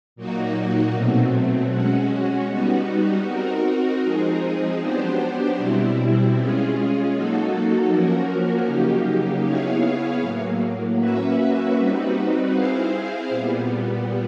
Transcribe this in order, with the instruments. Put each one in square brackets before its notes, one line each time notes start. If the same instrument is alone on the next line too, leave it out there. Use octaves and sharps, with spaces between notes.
[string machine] A#2 F#3 A#3 D#4 F#4
B2 F#3 A3 C4
G#3 C#4 F#4
G3 B3 D#4 F#4
C4 D#4 F#4 A#4
F3 G#3 C4 D#4 G#4
F#3 B3 D4 G4 C5
B2 G3 C4 E4
G#3 C#4 F4 G#4
F#3 A#3 D#4 F#4 A4
F3 A#3 C#4 F#4 A#4
C#3 F#3 A#3 D#4 G4
B3 E4 G#4 C#5 F5
A2 F#3 A#3
A#3 C#4 F#4 B4 E5
G3 C4 D#4 F#4 B4
C4 E4 G#4 C5 F5
A#2 G3 B3